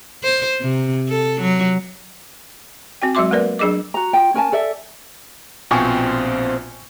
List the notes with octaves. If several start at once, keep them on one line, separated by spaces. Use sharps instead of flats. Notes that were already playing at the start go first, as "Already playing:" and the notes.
C5
C3
A4
F#3
C4 F#4 G5
F#3 G#3 F#4 E5 C6 D6
A3 A#3 A#4 B4 D5
F#3 D4 G#4 D#5 D6
F#4 A#5
F4 G5
C#4 A#4 G#5 A5
A4 D5 E5
A#1 B2 C4 F4 G5 G#5 C#6